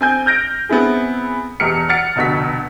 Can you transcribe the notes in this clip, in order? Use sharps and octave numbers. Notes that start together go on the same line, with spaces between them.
C4 G#5 G6
F6 G6 A#6 D7
B3 C4 E4 G#4
E1 E2 G4 F6 C#7
F#5 F6 A6 C#7
F1 D2 B2 B6